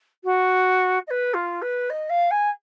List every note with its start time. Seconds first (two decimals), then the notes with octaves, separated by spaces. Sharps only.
0.24 F#4
1.07 D#5
1.11 B4
1.34 F4
1.62 B4
1.90 D#5
2.10 F5
2.31 G#5